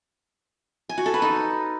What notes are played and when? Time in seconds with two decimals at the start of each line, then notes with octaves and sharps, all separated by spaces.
0.89 G#5
0.98 F#4
1.06 A4
1.14 B4
1.22 D#4